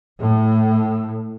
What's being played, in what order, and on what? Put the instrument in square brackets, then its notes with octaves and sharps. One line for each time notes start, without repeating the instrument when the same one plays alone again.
[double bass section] A2